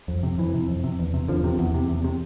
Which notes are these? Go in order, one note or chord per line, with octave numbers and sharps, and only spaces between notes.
F2
C3
F2 E3
C3
F2
C3
E2
C3
E2 D3 F3
C3
E2
C3
E2
C3